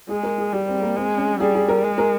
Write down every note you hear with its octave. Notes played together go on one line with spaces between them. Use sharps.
G#3 G#4
A#4
G#4
G3 G4
C4
A#3
G#3 C4
C#4
G3 G#4
G#4
A#4
G#3
A#4